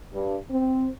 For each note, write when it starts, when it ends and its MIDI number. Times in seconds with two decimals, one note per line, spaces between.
0.13 0.37 43
0.51 0.88 60